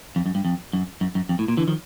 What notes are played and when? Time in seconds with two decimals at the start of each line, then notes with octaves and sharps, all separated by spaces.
0.16 F2
0.26 F#2
0.35 G2
0.45 F2
0.73 F#2
1.01 F#2
1.15 F#2
1.29 F2
1.39 A2
1.48 A#2
1.57 D3 E3
1.68 D#3 F3